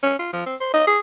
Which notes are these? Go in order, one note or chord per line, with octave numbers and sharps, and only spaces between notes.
C#4
F4
F3
C4
C5
D#5
G#4